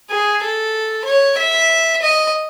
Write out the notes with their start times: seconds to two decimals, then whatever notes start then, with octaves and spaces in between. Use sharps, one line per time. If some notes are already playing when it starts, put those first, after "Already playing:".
0.10 G#4
0.42 A4
1.05 C#5
1.37 E5
2.02 D#5